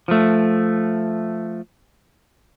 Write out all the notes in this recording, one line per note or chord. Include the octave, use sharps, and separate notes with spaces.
F3 A3